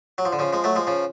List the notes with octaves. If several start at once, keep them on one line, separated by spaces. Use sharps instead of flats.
F#3
F3
D3
C#3 F3
F3 G#3
F#3 A3
F3 G#3
C#3 F3